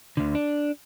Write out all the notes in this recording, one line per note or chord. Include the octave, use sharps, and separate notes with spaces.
D2 D3
D4